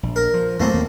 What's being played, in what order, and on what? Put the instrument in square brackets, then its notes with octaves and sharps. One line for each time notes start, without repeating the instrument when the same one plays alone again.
[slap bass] A#1
[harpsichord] A#4
[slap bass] F3
[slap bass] E2 A#2 F#3 [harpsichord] A3 A#3 C4
[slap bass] D#2